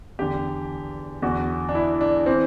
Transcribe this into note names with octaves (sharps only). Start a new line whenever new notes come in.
E2 D3 G4
E2 D3 F#4
D4
E4
D4
E3 C4